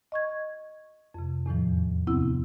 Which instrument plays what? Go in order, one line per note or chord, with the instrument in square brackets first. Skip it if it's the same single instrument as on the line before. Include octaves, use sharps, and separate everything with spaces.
[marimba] D#5 C#6 G#6
F2 C3
E2 A2 D#3 F3
D2 C3 B3 C4 E4 E6